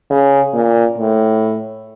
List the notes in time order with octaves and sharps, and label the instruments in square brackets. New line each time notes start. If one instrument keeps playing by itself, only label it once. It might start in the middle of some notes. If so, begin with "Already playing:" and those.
[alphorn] C#3
A#2
A2